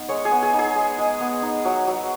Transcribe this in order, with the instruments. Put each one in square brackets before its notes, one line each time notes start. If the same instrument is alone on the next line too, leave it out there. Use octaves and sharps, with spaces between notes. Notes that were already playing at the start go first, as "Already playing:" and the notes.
Already playing: [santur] B3 D#4
G#3 C#5
G#4
B3
G#4
D#4
G#4
G#3
G#3
B3
D#4
F#3
F#3